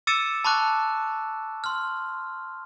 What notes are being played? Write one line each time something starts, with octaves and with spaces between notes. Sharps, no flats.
D6 E6 A6 C#7 D#7 E7
A5 B5 C#6 D6 F#6
C6 F6